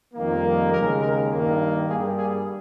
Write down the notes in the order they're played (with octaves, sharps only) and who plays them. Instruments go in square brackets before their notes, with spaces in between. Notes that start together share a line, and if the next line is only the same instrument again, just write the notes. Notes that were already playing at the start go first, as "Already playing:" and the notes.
[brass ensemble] F2 D#3 G3 A#3
A#4
D#2 C#3 G#3 A#4
A#4
G2 D#3 A#3
G2 G3 A#3 G#4
G#4